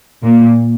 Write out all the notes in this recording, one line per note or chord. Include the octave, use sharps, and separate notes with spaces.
A#2